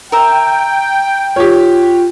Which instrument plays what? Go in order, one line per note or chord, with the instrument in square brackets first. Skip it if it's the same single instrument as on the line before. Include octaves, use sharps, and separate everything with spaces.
[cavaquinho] A#4 E5 [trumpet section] G5
[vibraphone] F4 [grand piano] G4 C#5